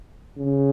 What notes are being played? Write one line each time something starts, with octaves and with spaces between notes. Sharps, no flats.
C#3